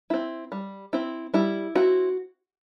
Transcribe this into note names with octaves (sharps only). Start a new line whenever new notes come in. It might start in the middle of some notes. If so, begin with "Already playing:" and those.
C4 E4
G3
C4 E4
G3 E4
C4 E4 F#4